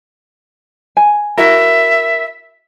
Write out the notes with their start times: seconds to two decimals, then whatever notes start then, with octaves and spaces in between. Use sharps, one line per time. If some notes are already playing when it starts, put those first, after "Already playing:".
0.97 G#5
1.37 E4 F#4 A#4 E5